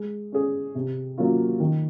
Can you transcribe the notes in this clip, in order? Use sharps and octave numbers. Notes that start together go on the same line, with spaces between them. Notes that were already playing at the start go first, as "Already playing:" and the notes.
Already playing: G#3
C#4 G#4
C3
F#3 A#3 C#4 F4
D#3